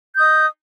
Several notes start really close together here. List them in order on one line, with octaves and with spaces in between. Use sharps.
G6 D#6 D#5